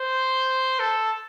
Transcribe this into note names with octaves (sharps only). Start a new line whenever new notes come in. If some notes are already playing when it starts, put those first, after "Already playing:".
Already playing: C5
A4